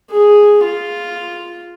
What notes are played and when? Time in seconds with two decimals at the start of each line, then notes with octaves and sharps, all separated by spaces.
0.11 G#4
0.64 F4